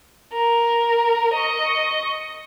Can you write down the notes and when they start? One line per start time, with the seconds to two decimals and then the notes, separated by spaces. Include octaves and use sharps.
0.33 A#4
1.33 D#5 C#6